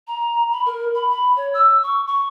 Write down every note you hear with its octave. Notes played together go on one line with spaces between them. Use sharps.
A#5
B5
A#4
B5
B5
C#5
E6
C#6
C#6